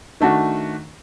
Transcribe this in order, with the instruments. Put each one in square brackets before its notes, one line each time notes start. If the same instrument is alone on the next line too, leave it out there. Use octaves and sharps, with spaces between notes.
[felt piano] D#3 A3 D4 F#4